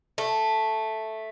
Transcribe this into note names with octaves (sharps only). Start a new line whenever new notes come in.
A3